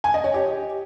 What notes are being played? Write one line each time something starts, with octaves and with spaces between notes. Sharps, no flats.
G#5
D#5
C#5
G4